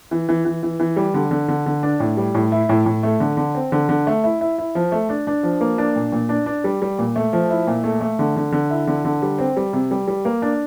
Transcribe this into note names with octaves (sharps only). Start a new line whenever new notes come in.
E3
E3
E3
E3
E3
G3
D3
D3
D3
D3
D4
A2
G3
A2
E4
A2
A2
A3
D3
D3
C4
D3
D3
A3
E4
E4
E4
F3
A3
D4
D4
F3
A#3
D4
A#2
A#2
D4
D4
G3
G3
A#2
A3
F3
E4
A#2
A3
A3
D3
D3
D3
E4
D3
D3
G3
C4
G3
C3
G3
G3
A#3
D4